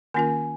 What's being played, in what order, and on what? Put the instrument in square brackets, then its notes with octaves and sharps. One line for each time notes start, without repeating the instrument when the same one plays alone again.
[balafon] D#3 A#3 C#4 F4 A#4 [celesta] G#5